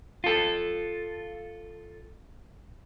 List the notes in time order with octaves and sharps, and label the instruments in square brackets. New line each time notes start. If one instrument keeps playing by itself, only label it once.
[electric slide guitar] F4 A4